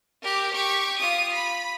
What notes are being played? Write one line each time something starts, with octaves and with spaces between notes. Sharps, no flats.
G4 A#4
G4 C#6
F4 D#6
B5